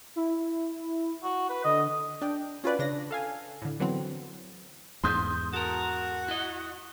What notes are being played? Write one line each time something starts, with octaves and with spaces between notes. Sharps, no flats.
E4
F#4
B4
D3 D#5
D4 G5
C#4 F4 F#4 B4 D5
C#3 D4 A#6
A4 F5 G#5
A2 D3
D3 E3 F#3 B3 C4
E2 G#2 C6 D#6 G6
F#4 A4 A#4
E4 D#5